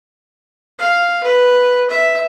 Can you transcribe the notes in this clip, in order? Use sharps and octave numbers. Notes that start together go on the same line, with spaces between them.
F5
B4
E5